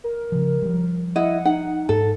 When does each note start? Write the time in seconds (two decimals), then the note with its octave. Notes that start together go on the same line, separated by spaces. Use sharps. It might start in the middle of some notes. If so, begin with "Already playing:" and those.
0.04 A#4
0.32 C#3 F3
0.62 F3 G3
1.16 E4 D#5 F#5
1.45 D#4 F#5
1.89 G#2 A4